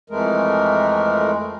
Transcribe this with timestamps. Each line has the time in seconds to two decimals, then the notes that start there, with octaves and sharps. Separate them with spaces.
0.10 F2 E3 G#3 A3 A#4